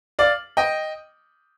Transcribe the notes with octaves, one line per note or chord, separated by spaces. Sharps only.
D5 F5
D#5 G5